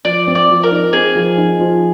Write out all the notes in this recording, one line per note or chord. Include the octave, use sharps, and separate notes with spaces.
F3 D5
C4
D5
F3
A#4
D#4
C4 G#4
F3
D#4
F3